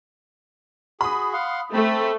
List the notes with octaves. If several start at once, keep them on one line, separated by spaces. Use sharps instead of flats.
F#4 G#4 B5 D#6
F5 F#5 C6
A3 C4 B5